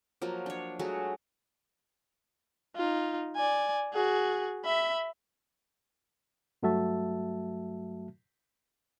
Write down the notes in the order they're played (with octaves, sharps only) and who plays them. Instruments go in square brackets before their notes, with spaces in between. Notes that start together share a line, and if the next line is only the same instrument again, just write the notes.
[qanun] F3 F#3 A#3
D4 C#5
F#3 G#3 A3 F#4
[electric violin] D#4 F4
D5 G#5
F#4 G#4
E5 B5
[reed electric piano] G2 F#3 A3 F#4 E5 A5